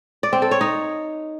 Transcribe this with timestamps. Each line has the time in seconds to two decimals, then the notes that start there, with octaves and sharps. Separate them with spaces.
0.23 D5
0.33 C4
0.42 A4
0.51 C#5
0.61 D#4